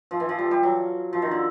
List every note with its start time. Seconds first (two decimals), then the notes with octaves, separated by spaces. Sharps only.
0.11 F3
0.20 E3
0.29 F3
0.39 G3
0.51 G3
0.63 F#3
1.13 F3
1.22 D#3
1.31 D3